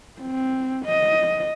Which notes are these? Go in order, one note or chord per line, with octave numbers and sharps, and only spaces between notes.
C4
D#5